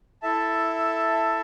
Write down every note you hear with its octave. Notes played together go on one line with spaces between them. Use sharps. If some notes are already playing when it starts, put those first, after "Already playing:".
E4 A4 E5 A5